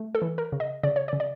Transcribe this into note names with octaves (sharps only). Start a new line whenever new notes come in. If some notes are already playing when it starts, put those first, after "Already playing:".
Already playing: A3
A4
E3
A#4
C#3
D#5
C#3 D5
C#5
D5
C#3
D5